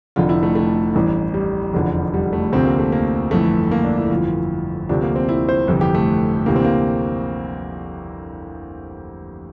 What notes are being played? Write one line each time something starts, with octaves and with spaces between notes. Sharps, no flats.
F1 F2 D3 F4
E4
A3
A3
A1 G2 E3
G3
F1 E2 D3 F3
G3
A3
D2 C3 F3 C4
A#3
A3
A#3
G1 F2 E3 A3
A#3
D4
E4
G1 F2 E3 F4
D2 C3 F3 D4
A#3
C4
E4
C5
G1 F2 C3 E3
G4
A3
D2 C3 E3 A#3
C4
A#3